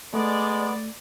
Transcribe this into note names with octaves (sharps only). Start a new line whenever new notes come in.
G#3 A3 B3 D5